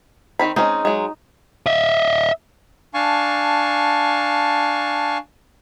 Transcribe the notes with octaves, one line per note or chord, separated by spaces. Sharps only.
D#3 C4 B5
G#3 C4 C#4 D#4
F#3 G#3
D#5 E5
D4 F5 G#5 A5 C#6